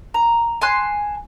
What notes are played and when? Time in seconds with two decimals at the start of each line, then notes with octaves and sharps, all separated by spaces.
0.14 A#5
0.61 G#5 A5 C6 F#6